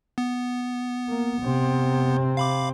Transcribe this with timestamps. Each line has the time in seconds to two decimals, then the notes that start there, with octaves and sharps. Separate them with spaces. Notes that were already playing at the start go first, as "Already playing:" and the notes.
0.18 B3
1.08 A#3
1.42 C3 C4
2.37 F5 B5 D6